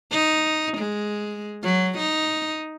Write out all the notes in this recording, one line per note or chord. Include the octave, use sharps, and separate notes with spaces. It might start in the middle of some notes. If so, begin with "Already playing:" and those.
D#4
G#3
F#3
D#4